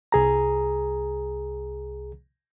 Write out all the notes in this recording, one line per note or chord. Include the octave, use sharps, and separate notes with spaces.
C2 G#4 A#5